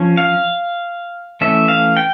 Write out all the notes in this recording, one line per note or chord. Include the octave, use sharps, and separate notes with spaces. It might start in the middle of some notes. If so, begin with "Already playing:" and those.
Already playing: F3 C#4
F5
E3 A3 C#4 E5
F5
G5